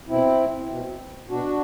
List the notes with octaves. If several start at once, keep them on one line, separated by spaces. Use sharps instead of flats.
B2 C4 E4
B2
B2 D4 F#4